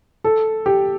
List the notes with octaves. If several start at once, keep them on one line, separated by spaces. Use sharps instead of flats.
A4
G4